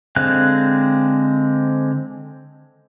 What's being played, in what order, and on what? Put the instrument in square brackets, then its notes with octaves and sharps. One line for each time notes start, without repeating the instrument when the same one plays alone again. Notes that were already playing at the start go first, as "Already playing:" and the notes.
[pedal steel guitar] D3 G#3 C4 F5 F#6